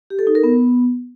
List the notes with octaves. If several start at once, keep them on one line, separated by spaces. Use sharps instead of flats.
G4
A4
D#4
A#4
B3